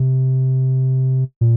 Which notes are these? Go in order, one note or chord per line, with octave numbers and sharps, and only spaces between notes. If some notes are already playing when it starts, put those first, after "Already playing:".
Already playing: C3
A#2